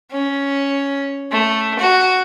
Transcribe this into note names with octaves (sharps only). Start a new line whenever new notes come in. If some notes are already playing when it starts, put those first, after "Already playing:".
C#4
A3
F#4